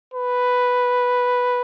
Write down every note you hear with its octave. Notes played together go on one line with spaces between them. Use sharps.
B4